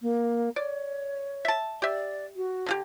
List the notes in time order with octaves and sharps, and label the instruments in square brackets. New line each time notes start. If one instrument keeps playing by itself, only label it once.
[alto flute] A#3
[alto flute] C#5 [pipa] D5
[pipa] E5 A5
[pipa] G4 E5 [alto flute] D5
[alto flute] F#4
[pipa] D3 F4 G4